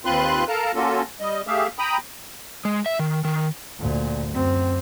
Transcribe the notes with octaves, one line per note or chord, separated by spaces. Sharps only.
D#2 C4 F4 B4 C6 F#6
A4 A#4 F5 A5 A#5
A#3 C#4 F4 F#4 A4
G3 D#5
A3 G4 G#4 E5 F5
G5 A#5 B5 D#6
G#3
E5
D#3
D#3
D2 A#2
F#2 C4